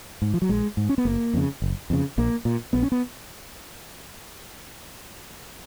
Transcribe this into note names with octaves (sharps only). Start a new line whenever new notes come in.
G#2
F3
F#3
A#1 G#3
G#2
C#4
B3
F#1 A#3
F2 C#3
F#1
F2 C#3
A#1 A#3
A#2
A#1 B3
C#4
B3